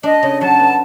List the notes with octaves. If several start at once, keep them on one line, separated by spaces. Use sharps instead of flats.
D4 D#5
C#3
F#3 A5
B3